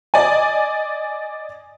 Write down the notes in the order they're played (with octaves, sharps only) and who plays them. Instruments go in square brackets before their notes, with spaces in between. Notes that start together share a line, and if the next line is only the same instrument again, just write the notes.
[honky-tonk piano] D5 D#5 G#5